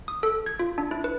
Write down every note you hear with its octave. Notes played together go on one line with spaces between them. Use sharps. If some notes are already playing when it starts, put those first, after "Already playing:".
D#6
A4
G#6
F4
D4
E4
B4